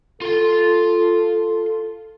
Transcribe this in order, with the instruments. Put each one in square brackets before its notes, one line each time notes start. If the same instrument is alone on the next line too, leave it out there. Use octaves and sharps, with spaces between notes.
[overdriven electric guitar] F4 C6 [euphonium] A4